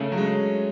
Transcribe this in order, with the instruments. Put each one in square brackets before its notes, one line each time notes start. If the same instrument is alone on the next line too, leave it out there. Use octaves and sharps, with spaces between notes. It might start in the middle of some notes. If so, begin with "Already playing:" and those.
Already playing: [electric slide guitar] C#3 C#4 [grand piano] A3
[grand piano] F#3
G#3